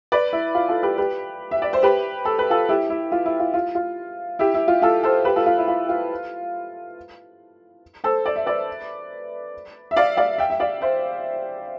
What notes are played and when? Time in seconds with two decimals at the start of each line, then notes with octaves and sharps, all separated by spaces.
0.12 B4 D5
0.33 E4
0.55 F4
0.69 F4 A4
0.83 G4 B4
0.98 G4 B4
1.51 E5
1.62 D5
1.73 C5
1.83 G4 B4
2.25 A4
2.39 B4
2.50 F4 A4
2.69 E4 G4
2.90 E4
3.12 F4
3.26 E4
3.40 F4
3.54 F4
3.75 F4
4.39 E4 G4
4.54 E4
4.68 F4
4.82 F4 A4
5.03 A4 C5
5.25 G4 B4
5.36 F4 A4
5.46 F4
5.58 E4
5.68 F4
5.89 F4
8.04 A4 C5
8.26 D5
8.36 E5
8.46 B4 D5
9.91 E5
9.96 D5 F5
10.17 D5 F5
10.38 E5 G5
10.50 E5
10.60 D5 F5
10.81 C5 E5